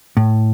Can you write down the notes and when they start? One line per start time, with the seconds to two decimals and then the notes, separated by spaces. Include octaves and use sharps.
0.17 A2